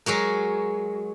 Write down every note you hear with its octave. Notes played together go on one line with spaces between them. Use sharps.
F#3 G#3 F#4 A#4